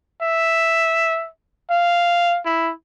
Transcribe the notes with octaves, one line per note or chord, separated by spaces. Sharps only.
E5
F5
E4